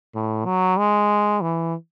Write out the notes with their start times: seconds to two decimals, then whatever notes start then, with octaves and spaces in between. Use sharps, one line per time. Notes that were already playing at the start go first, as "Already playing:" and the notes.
0.15 A2
0.46 F#3
0.78 G#3
1.41 E3